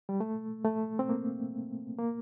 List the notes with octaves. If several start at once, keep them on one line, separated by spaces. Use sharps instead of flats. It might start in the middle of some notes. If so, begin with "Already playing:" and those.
G3
A3
A3
C4
A#3
A#3